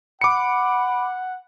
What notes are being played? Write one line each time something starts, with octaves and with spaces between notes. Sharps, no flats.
F#5 B5 D6 C#7